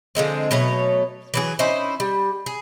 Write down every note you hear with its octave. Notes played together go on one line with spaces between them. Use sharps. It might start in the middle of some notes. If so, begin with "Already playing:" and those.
D3 F3 G#3 C4
B2 F#3 A3 C#5
E3 F#3 G#4
C#4 D#4 E4 C5
G3
G#4